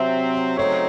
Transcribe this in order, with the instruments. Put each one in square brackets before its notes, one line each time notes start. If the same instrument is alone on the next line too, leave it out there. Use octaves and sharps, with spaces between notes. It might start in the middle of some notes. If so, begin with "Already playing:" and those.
Already playing: [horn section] C3 F#3 C4 [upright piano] E5
[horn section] C#3 F#3 A3 C4 D#4 [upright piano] C#5